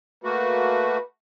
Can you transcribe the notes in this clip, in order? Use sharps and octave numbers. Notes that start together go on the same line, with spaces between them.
A3 A#3 F#4 B4